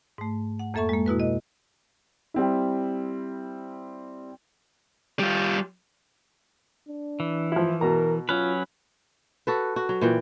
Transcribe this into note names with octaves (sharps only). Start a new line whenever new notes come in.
G#2 A3
F#5
F2 A#3 A4 E5 A5 C#6
G#3 A#3
B2 E4 F#4 B4
D#5
G3 C4 E4
G3 F4
D4
E3
F3 E4
B2 A#4 A#5
F#3 C#4 F4 B4
F#4 A4 B4
F#4
F#3
A#2 E3 G5